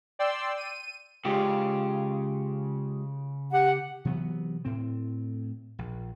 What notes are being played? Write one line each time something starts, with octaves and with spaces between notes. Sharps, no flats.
D5 G5 C6 E6
D#7
C#3 G#3 F4 G4
G4 F#5
C3 E3 F#3 B3
A2 C4
A#1